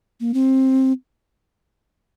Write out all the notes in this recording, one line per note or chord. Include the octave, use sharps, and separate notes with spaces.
A#3
C4